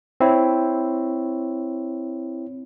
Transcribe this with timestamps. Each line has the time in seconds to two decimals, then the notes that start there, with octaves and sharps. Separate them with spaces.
0.21 C4 E4 C#5